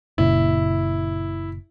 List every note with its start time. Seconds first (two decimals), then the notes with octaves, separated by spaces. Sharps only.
0.18 F#1 A#2 C#3 E4